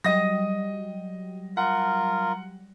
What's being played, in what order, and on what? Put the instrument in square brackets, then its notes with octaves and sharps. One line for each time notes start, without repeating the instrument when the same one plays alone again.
[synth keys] F#3 G3 [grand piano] D#5 D#6 A#6
[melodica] F4 A#4 [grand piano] F#5